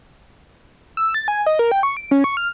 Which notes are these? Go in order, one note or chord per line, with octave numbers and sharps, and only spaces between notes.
E6
A6
G#5
D#5
A#4
G5
C#6
D7
C#4
C#6
F6